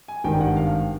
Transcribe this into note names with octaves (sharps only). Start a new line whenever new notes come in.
G#5
G#1 G2 D#3 G5
F#5
F5